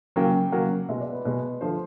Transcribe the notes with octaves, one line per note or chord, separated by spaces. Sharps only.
C#3 F#3 A#3 G5
C#3 F#3 A#3 F#5
B2 G#3 E5
D5
B4
B2 G#3 B4
D3 F3 A3 C5